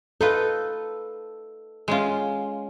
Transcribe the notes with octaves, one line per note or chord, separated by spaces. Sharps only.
D#4 F4 A4 B4
G#3 C#4 F4